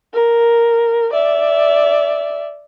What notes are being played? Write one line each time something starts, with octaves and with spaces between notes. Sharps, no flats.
A#4
D5 E5